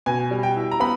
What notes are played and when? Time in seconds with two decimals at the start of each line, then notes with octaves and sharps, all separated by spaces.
0.06 B2 G#5
0.31 G3
0.43 G5
0.56 E4
0.72 A#5
0.80 B3 B5